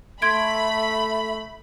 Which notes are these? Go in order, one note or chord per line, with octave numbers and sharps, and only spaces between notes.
A3 E5 B5 C6 G#6 D7